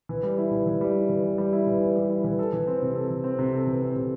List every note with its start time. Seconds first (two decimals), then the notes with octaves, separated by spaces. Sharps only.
0.09 E3
0.23 G3
0.38 E4
0.52 E3
0.67 E3
0.81 G3
0.95 E4
1.09 E3
1.23 E3
1.38 G3
1.53 E4
1.67 E3
1.81 E3
1.96 G3
2.09 E4
2.24 E3
2.39 A4
2.53 E3
2.67 C4
2.82 C3
2.95 A4
3.11 E3
3.24 C4
3.39 C3
3.53 A4
3.67 E3
3.82 C4
3.96 C3